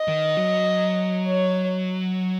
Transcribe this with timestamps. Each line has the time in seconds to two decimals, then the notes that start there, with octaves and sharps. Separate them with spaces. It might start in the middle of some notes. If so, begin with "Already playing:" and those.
Already playing: D#5
0.08 D#3
0.37 F#3
1.27 C#5